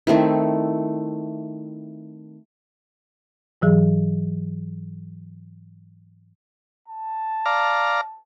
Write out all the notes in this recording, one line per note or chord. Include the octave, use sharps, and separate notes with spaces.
D#3 A3 C4 E4
G#2 E3 F#3 G#4
A5
D5 F5 A#5